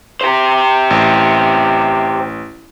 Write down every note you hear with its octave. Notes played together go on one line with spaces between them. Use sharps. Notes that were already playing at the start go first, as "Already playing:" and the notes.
G4 C5
A1